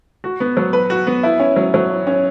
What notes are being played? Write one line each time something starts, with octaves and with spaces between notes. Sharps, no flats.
F#4
B3
F#3
B4
F#4
B3
E4
C#4
F#3
F#3
E4
C#4